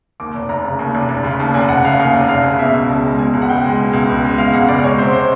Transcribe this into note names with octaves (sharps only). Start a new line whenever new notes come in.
D#2 D6
F1
F1 A#5
C#3
D#2
F1
F1
C#3
D#2 A5
F1 G#5
F1 F#5
C#3 F5
D#2 F5
F1
F1 F5
C#3
B2 E5
C#2
C#2 A5
G#3
B2 G#5
C#2
F#5
C#2 G5
G#3
B2
C#2
C#2
G#3
B2 F5
C#2 F#5
C#2 D5
G#3 C#5
C3 C5
C5